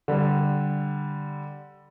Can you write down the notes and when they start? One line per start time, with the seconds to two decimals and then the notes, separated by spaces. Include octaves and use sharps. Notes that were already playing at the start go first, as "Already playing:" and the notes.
0.08 D3 G3